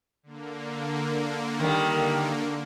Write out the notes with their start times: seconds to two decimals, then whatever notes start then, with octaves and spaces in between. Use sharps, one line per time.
0.23 D3 A#3
1.60 D#3 G3